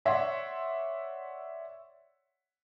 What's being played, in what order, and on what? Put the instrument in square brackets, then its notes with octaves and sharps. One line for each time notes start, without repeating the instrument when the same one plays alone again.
[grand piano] C#5 D5 E5 F#5 C6